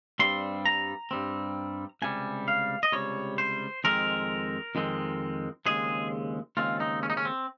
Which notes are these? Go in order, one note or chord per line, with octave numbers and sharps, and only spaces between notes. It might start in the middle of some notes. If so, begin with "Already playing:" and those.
G2 G3 C4 C6
A#5
G2 G3 C4
C#2 C3 G3 G#5
F5
D#5
C#2 C3 G3 C#5
C5
F2 D#3 G#3 C4 A#4
F2 D#3 G#3 C4
D#2 C#3 G#3 C4 G#4
D#2 C#3 G#3 C4 F4
D#4
C#4
D#4
C#4
C4